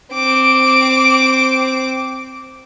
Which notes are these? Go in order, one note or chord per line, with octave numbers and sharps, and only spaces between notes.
C4 D6